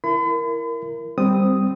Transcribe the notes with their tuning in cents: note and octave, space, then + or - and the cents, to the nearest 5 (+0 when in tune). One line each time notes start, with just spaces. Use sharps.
E4 +25 A#4 +0 B5 +45
G3 +5 C4 -10 D#6 +0